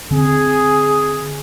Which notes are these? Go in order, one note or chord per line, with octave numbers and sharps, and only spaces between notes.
D3 C4 G#4